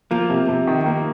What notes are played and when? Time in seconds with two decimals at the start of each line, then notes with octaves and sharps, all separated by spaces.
0.11 F3 A#3 F4
0.30 C3
0.49 C3
0.67 D#3
0.86 A#3